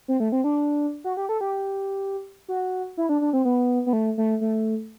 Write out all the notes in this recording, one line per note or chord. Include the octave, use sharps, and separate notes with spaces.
C4
A3
C4
D4
F#4
G4
A4
G4
F#4
E4
D4
D4
C4
B3
B3
A3
A3
A3